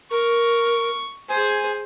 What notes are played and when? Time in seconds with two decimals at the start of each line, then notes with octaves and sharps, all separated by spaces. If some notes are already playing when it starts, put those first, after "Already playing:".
0.11 A#4 C#6
1.29 G#4 C5 G#5